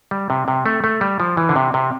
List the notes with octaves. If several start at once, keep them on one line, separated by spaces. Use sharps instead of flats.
G3
C3
C3
A3
A3
G3
F3
E3
D3
C3
C3